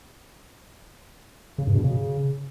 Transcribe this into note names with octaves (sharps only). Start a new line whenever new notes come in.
C#3
G2
B2
C#3